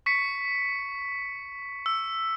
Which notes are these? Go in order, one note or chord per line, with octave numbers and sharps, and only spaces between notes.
C#6 B6 C#7
E6